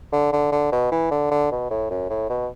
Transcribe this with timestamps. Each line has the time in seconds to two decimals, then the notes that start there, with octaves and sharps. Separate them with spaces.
0.13 D3
0.32 D3
0.52 D3
0.72 B2
0.92 E3
1.11 D3
1.31 D3
1.51 B2
1.71 A2
1.90 F#2
2.09 A2
2.29 B2